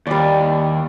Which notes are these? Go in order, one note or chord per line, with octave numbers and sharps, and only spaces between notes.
D#2 G3 D5